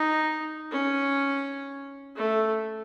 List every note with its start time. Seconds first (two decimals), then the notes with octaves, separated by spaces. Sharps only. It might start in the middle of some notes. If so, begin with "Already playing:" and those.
Already playing: D#4
0.71 C#4
2.16 A3